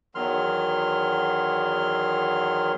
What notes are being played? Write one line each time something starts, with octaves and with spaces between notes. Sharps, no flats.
E2 D#3 F#3 C6 F6